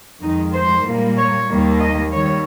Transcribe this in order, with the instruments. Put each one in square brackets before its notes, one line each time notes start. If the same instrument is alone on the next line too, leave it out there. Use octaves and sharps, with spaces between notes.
[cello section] F2 D#3 G#3 D#4
C5
A#2 G3 A#3
C#5
D#2 D#3 G3 A#3
D#5
D#2 D#3 G3 C#5